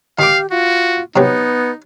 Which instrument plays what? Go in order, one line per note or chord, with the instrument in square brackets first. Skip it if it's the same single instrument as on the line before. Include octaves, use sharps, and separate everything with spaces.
[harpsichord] D#3 D6 [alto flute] G4 [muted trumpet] F5
[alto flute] F4 [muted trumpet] F#4
[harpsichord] C3 F#3 C4 [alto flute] B3 [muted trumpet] D#4